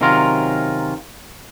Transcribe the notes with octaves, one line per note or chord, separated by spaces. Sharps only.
C3 D#3 F#3 C#4 F4 A#4